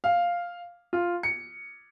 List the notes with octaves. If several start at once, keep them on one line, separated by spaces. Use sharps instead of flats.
F5
F4
C#7